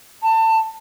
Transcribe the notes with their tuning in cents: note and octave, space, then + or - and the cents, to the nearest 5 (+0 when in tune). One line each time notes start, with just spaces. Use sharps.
A5 +25